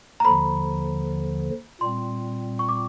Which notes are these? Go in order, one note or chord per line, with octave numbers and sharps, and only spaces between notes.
A#5
D#2 D3 F3 B5
A#2 G3 C4 C6
C#6
D6